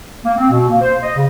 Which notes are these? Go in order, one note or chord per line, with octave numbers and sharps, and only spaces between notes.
A#3
C4
B2
A#3
C5
D#5
C#3